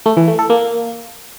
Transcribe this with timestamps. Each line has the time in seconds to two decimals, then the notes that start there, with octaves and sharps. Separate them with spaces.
0.06 A3
0.17 E3
0.28 A3
0.39 A4
0.50 A#3